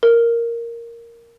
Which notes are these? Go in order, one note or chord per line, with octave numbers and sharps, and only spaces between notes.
A#4